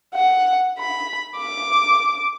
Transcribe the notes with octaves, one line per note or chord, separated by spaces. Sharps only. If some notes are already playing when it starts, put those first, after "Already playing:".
F#5
B5
D6